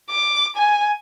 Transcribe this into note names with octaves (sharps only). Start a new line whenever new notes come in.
D6
G#5